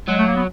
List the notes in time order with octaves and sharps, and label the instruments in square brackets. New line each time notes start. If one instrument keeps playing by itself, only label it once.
[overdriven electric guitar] F#3 [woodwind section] G#3
[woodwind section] A3
A#3
B3